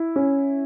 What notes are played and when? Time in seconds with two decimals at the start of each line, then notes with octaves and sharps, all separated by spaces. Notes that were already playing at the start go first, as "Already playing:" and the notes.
Already playing: E4
0.16 C#4